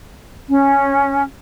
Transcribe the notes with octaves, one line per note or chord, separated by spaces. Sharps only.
C#4